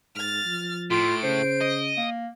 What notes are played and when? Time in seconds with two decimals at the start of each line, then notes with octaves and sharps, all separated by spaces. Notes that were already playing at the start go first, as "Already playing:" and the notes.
0.15 G#2 F6 A6
0.45 F3
0.91 A2 F4 D7
1.23 C#3 C5
1.61 D#5
1.97 A#3